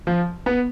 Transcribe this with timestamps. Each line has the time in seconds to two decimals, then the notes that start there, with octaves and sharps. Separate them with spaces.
0.07 F3
0.46 B3